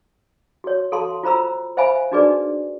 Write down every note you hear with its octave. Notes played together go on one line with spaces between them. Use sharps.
F#4 C#5
F#4 A4 F5 A5 C6
F4 C5 A#5 B5 E6
C5 E5 F5 G#5 B5
D4 D#4 F#4 G#4 B4 D5